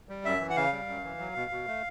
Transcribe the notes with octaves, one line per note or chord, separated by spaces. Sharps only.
G3
F#2 E5
E3
F#5
C#3 F5
G3
F#2
E3
F#3
B2
B2
A3